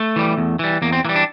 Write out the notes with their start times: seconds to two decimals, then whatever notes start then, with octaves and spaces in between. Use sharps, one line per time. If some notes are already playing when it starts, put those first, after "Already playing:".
Already playing: A3
0.16 E3 G3
0.38 E2
0.59 E3 G3
0.82 E2 A#3
0.93 C4
1.05 E3 A#3
1.09 G3
1.16 D4